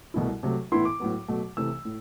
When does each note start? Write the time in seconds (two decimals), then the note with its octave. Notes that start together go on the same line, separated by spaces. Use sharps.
0.14 C2 B2 A3 E4
0.43 C3 F#3 A3
0.72 A2 E3 B3 E4 C6
0.85 D6
1.00 A2 F#3 B3
1.28 B2 F#3 A3
1.57 C3 E3 A3 E6
1.85 A2